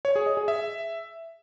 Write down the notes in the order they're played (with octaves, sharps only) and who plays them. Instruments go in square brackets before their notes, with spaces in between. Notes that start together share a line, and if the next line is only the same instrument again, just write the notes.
[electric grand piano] C#5
G#4
D#5
G#4
E5